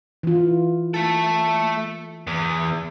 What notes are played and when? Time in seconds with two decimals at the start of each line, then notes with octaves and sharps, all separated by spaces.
0.23 E3 F4
0.94 A3 A4
2.27 E2